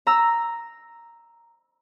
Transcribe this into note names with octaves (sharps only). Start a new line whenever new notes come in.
A#5 E6